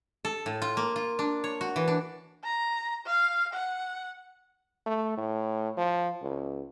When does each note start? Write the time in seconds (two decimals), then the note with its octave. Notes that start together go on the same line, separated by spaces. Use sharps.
0.25 A4
0.46 A2
0.62 F4
0.77 A#3
0.96 F4
1.19 D4
1.44 C#5
1.61 F#4
1.76 E3
1.88 D4
2.44 A#5
3.06 F5
3.53 F#5
4.86 A3
5.18 A2
5.77 F3
6.22 C#2